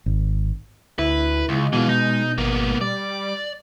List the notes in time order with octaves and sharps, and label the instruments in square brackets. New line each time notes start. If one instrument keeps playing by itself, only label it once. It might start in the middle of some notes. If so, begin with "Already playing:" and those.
[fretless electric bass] G#1
[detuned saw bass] D2 [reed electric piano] E4 [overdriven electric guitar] B4
[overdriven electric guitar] C#2 [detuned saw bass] G#3
[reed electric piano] B2 [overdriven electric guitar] E3 F4
[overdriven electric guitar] D#4
[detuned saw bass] G#1 [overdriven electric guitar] A#3 B3
[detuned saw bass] G3 [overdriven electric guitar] D5